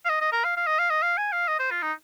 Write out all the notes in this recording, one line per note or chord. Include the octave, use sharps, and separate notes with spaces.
F5
D#5
D#5
A#4
F5
F5
D#5
F5
D#5
F5
G#5
F5
D#5
C5
F4
D#4